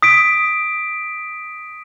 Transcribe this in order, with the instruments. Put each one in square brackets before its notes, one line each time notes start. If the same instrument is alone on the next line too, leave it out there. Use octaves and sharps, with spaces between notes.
[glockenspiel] D#6 B6 D7